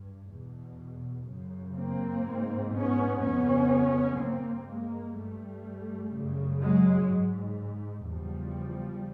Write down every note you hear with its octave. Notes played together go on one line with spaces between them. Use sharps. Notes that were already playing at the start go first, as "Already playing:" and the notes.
Already playing: G2
E2 B2
F#2 C#3
A#3 C4
G#2
B3 C#4
F2 C#3 B3 C#4
G2 A#3 C4
G#3 A#3
G2 G3 A3
F#2 C#3
F#3 G#3
G#2
E2 C#3 F3 G3